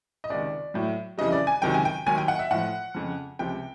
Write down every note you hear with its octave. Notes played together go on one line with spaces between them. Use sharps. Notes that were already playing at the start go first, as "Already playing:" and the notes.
D#5
C#2 C3 D#3 D5
A2 F#3
F2 C#3 E3 G3 D#5
D5
G#5
C#2 C3 D#3 F#3 G5
G#5
G5
D#2 D#3 F#3 G#5
G5
F#5
E5
A2 F3 F#5
F2 C#3 F3
C#2 C3 F3 G5